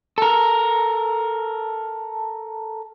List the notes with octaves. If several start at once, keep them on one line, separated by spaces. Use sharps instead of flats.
A4 A#4